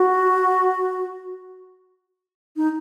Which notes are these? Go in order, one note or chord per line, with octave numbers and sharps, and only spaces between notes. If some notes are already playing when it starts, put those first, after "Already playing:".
Already playing: F#4
D#4